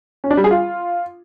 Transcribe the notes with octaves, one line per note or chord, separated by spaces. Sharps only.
C#4
D4
G3
G#4
F4